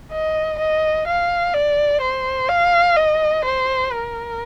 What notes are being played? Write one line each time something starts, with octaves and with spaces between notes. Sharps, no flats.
D#5
D#5
F5
D5
C5
F5
D#5
C5
A#4